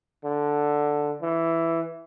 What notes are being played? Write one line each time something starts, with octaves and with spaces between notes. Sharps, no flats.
D3
E3